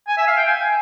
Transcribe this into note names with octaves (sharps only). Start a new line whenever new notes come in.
G#5
E5
F5
G5
G#5